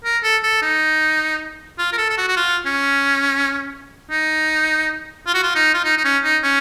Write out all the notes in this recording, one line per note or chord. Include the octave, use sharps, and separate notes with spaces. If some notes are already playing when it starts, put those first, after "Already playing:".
A#4
A4
A4
D#4
F4
A#4
A4
A4
F#4
F#4
F4
C#4
D#4
F4
F#4
F4
D#4
F4
D#4
D#4
C#4
D#4
C#4